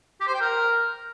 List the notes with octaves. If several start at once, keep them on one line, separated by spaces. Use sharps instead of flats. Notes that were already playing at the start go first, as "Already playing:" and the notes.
G4
C5
G5
A#4